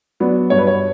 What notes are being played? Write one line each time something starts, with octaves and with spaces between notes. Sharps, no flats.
F#3 B3 D4
G2 C#5
B4
C#5